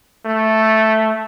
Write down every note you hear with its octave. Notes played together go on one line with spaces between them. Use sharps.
A3